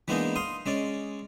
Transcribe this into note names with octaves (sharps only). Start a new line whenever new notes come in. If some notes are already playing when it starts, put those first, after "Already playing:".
E3 G#3 A#3 B3 D4 D#4
F5 C6 D#6
G#3 C#4 D5